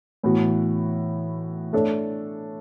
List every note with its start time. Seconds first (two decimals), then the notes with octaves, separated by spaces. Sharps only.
0.23 A2 E3 B3 F#4
1.73 A3 D4 A4 C#5